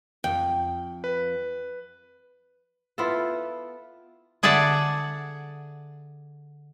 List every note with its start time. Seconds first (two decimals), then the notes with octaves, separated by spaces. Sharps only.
0.24 F2 G5
1.04 B4
2.98 B3 E4 F4 A4
4.43 D3 G#4 D5 E5 F#5 A5